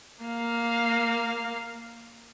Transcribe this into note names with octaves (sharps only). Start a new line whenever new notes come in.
A#3 F5